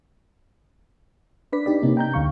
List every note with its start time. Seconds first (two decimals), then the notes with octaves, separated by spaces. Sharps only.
1.53 D4 B4 D5 B6
1.66 D4 D#4 G4 D5
1.82 C3 A#3 C#4 D#4
1.97 G5 A#5 G6
2.14 D2 D3 F5 C#6